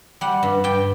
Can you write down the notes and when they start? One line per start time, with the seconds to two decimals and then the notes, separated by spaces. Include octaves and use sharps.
0.21 G3 F#5
0.43 G2
0.64 G2 G5